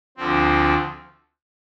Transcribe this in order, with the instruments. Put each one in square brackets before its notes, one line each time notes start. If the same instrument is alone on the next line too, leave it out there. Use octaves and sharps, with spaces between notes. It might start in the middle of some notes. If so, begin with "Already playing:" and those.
[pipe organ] D2 D3 F3 C4